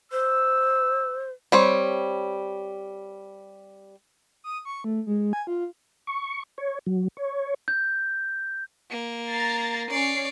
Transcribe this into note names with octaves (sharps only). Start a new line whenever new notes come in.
C5 E6
G3 C4 C#5
D#6
C#6
A3
G#3
G#5
F4
C#6
C#5
F#3
C#5
G6
A#3
A#5 A6 C7
C#4 C#5 D5 C7